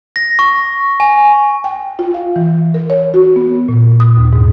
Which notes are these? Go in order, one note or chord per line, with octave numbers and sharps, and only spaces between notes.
A#6
C#6
G#5
G5
F4
F5
E3
A#4
C#5
F#4
B3
A#2
D#6
D#2
G#2